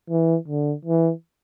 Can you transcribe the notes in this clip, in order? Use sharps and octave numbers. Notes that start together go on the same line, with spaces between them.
E3
D3
E3